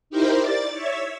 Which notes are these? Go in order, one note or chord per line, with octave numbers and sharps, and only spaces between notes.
D#4 E4 G4 A#4 C5
D5 A6
C#5 E5